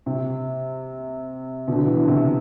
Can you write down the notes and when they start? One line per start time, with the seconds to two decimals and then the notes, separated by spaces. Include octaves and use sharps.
0.06 C3
1.68 B2 D3
1.86 E3
1.98 D3
2.08 C3